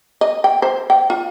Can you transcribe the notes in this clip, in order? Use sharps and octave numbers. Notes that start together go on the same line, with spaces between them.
D#5
G5
C5
G5
F4